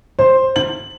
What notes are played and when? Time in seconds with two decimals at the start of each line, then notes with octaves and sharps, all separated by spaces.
0.19 C5
0.56 F#7